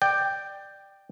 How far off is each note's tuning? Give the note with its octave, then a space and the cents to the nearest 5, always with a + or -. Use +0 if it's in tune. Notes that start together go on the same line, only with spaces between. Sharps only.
D5 +15 G5 +0